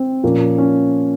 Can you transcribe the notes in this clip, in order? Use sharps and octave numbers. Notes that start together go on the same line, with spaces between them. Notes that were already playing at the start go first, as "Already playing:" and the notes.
Already playing: C4
A#2 F3 A#3 C#4
C#4